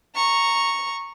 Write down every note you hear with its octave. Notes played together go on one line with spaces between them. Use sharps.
A#5 C#6